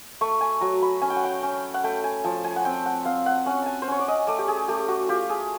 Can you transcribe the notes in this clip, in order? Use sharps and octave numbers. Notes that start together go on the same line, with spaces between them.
A3 C#6
G#5
F#3 A#5
B5
C#4 G#5
G5
F#5
G5
C#4
F#5
A3 G5
G#5
F3 A5
G#5
F#5
C4 G5
F#5
C4 F5
F#5
C#4 F#5
G#5 A5
C5
C#4 C#5
D5
D#5
A3 D5
G4
G#4
A3 G4
F#4
F4 G4
G#4